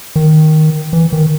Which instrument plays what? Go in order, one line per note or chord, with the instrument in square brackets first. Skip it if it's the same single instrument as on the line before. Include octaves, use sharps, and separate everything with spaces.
[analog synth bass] D#3
E3
D#3